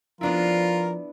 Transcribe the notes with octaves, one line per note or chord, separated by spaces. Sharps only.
F3 B3 D4 E4 F4 A#4